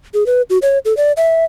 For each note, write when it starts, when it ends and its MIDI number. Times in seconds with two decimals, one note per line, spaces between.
0.14 0.26 68
0.26 0.42 71
0.50 0.58 66
0.62 0.79 73
0.85 0.95 69
0.97 1.12 74
1.17 1.45 76